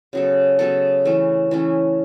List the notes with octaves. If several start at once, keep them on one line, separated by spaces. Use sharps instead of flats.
C#3 F#3 B3 A4
C#3 F#3 B3 A4
E3 A3 C#4
E3 A3 C#4